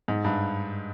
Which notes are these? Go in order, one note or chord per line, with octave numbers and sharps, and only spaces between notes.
G#2
G2